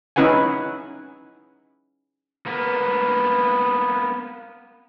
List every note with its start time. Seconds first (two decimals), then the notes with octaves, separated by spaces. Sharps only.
0.16 C#4 D#4 E4 B4 F#5 G#5
2.46 A#3 B3